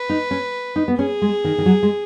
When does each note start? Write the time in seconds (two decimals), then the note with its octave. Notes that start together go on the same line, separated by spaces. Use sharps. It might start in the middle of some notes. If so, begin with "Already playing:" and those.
Already playing: B4
0.09 D#4
0.31 C#4
0.76 D#4
0.88 B3
0.99 C#4 G#4
1.22 G#3
1.44 D#3
1.58 D#3
1.66 F#3
1.83 G#3